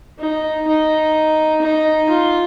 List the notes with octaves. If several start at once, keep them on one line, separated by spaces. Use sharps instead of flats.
D#4
D#4
D#4
F4